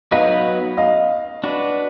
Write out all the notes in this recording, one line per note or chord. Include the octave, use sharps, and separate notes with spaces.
F#3 B3 D#4 F#4 B4 D#5 F5
D#5 F5
D4 F#4 B4